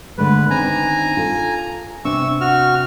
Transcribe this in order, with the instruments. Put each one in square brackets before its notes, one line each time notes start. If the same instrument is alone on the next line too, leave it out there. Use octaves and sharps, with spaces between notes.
[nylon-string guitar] D3 G#3 A3 [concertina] B4
[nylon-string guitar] D#3 C4 D4 [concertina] G#5 A#5
[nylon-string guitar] F4 A4
[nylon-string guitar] C3 D4 [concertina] C#6 E6
[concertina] F#4 F6